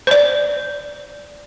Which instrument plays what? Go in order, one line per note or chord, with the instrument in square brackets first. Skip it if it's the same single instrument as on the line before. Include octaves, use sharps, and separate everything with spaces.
[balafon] C5 D5